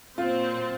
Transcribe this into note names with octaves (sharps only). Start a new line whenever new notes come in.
A#2 F#3 C4 F4